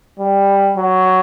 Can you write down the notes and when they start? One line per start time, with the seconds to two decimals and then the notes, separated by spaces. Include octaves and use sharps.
0.19 G3
0.77 F#3